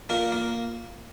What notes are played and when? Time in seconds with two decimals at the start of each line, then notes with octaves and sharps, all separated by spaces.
0.09 A#2 A#3 A#4
0.32 A#3